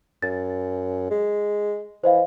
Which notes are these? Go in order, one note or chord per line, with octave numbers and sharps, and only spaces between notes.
F#2 A6
G#3
E3 C5 D#5 F5